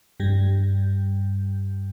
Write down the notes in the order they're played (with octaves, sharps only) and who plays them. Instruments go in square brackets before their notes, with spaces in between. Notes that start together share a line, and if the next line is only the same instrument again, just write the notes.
[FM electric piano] G2 G3